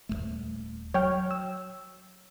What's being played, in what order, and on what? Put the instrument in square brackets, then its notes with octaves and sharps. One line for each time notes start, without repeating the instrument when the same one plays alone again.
[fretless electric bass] D#1 D#2 A3
[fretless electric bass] F#3 [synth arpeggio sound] C#5 G5 F6
[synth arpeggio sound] E6